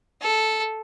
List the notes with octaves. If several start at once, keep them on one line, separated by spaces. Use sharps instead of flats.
A4